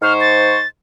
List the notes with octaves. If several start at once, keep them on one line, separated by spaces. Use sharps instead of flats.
G#2 C5 C#6 F6
A6